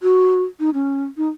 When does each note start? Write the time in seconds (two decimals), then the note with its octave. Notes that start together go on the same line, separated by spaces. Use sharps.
0.02 F#4
0.60 D#4
0.74 C#4
1.17 D#4